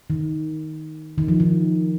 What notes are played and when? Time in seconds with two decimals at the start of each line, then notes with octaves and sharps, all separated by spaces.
0.10 D#3
1.18 D#3
1.28 F3
1.40 D#3